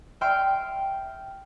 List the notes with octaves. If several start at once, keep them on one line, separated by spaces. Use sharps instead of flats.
E5 G5 C6 F6 D7